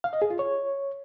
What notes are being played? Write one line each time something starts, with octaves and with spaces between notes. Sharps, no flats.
F5
D#5
G#4
F4
C#5